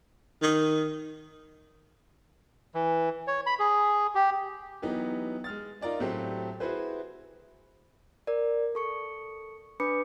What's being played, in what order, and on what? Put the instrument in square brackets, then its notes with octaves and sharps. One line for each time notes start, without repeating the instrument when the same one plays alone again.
[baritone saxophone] D#3
[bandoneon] E3
C#5
B5
G#4
G4
[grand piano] E3 F#3 B3 D#4 G4
G#3 F6 A6
D#4 F4 A#4 D5 D#5
A2 F#3 A3 C4 G4
E4 F#4 G#4 B4 C5
[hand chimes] A#4 D5
A4 C#6 C#7
D4 B4 B5 D6 C#7